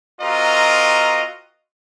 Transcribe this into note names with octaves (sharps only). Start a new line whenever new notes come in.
C4 F4 F#4 A#4 D#5 A#5